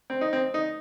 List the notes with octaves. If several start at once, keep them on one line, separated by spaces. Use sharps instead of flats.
C4
D#4
C4
D#4